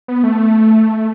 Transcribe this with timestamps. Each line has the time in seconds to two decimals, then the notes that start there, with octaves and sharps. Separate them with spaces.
0.08 B3
0.24 A3